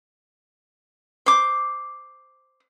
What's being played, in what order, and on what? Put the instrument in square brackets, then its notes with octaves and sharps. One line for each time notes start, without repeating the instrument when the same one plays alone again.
[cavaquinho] C5 D6